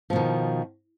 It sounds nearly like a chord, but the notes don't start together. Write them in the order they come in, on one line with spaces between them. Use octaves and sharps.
F3 B2 D#3